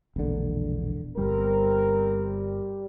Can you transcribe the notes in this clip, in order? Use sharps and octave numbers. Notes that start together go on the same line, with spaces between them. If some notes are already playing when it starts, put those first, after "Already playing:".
E1 A#1 D3
G1 G3 C4 A#4